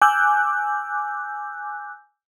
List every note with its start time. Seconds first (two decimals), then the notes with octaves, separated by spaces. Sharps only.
0.02 G#5 D6 E6 F#6 G6